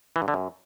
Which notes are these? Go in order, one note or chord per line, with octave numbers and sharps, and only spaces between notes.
E3
G2
D3
F#2